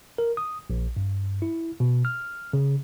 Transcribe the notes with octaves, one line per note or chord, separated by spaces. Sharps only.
A#4
D#6
A#1
G2
E4
B2
F6
C#3